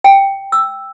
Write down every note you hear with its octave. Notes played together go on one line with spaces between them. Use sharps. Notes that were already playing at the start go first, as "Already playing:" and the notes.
G5
E6